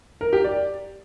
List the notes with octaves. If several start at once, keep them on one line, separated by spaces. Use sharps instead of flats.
A#4
G4
D5